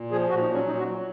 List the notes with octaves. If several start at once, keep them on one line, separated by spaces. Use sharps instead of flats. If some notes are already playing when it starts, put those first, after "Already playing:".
Already playing: A#2
F3 G#4
A#2 F#4
D#4
F#3
C#4
A#2 D#4
F#4
F#3